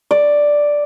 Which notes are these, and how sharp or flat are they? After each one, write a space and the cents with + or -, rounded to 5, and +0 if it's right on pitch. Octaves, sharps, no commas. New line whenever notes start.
D5 +0